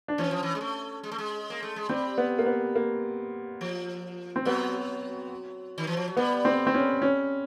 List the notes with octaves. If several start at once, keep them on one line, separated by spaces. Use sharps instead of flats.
D4
E3 C#4
F3
E3
G#3
A3
G#3
A3
G#3
A#3
A3
G#3
G3 C4
B3
A#3
B3
A#3
F3
C4
F#3 B3
D#3
E3
F3
F#3
G3 B3
C4
C4
C#4
C#4